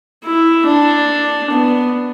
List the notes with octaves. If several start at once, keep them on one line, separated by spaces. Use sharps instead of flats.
E4
D4
B3